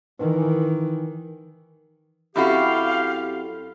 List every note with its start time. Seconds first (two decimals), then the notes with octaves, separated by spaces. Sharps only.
0.20 D#3 E3
2.36 F#2 C4 E4 F#4 G4 A4 F5